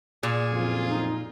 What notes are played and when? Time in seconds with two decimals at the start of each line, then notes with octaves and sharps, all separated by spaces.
0.23 A#2 G#4
0.52 F#1 F2 F4
0.89 D#4